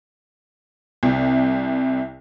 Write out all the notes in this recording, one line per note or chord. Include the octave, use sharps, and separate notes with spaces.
C2 C3